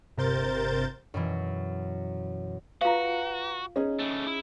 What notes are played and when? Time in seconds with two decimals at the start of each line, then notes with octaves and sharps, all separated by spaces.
0.17 G1 C3 A#4 C5 G6 A6
1.14 F#2 B2 E3
2.81 F4 F#4 B4 F5 A#5
3.76 C#4 D#4 G#4
3.99 C#3 A3
4.26 E4